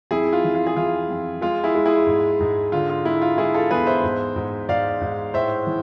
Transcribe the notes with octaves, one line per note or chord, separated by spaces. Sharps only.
F2 E4 G#4
F4
E3
F4
G#4
E3 F4
F2
G#3 F4
E4 G#4
G#3
E4 G#4
G#2
G#2
D3 F4
F4
G#3 E4
F4
G#3 E4 G#4
F4 A4
E2 G#4 B4
C5 E5
G#2
G#2
G#2 D5 F5
G#2
A2 C5 E5
E3